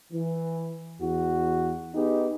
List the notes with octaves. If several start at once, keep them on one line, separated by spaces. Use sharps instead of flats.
E3
E2 F#4
B3 D#4 G4 G#4